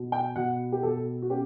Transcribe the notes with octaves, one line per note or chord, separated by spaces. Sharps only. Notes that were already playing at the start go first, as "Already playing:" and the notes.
Already playing: B2
G5
B2 F#5
G4
B2 A4
F#4
C#4 G4